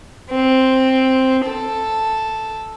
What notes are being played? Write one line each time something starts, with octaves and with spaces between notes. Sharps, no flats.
C4
A4